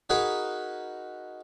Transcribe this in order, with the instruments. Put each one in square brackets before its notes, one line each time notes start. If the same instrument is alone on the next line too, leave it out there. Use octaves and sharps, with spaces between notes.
[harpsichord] D#4 F#4 G#4 A#4 B4